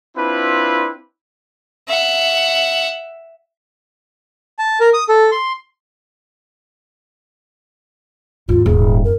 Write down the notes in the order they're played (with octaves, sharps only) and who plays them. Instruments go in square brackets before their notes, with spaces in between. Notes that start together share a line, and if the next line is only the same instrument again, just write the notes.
[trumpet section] C4 D4 E4 F4 B4 B5
[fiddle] E5 F#5
[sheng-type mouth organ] A5
A#4
D#6
A4
C6
[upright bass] D#2 [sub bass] G#2 [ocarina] F4
[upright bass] D#1 [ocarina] G#4
[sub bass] F#2 [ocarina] A#4